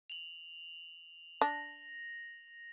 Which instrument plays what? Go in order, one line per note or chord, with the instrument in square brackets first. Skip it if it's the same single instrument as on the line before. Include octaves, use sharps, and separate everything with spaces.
[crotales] F7 F#7
[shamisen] D4 [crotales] A#6